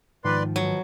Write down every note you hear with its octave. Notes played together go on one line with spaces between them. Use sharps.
G#2 D#3 F3 B4 D5 C6
B2 F#3